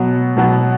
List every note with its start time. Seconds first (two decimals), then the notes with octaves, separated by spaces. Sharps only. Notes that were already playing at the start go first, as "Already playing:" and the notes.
Already playing: B2 F#3 B3
0.37 B2 F#3 B3